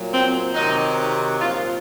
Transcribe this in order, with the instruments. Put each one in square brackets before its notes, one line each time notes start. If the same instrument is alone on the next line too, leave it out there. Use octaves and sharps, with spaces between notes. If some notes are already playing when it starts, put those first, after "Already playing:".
Already playing: [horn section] A#2 F#3
C4
C3 D#3 F#3 D#4
A#2 F3 F4